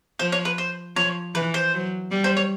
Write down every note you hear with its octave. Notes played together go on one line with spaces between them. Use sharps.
F3 C5
C#5
B4
C5
F3 C#5
E3 B4
C5
F#3
G3
C5
C#5